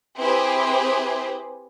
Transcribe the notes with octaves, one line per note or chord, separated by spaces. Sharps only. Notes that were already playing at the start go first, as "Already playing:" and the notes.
C4 E4 G4 G#4 B4 C5